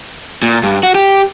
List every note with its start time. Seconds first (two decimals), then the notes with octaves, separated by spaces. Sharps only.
0.43 A#2
0.63 G2
0.83 F#4
0.95 G4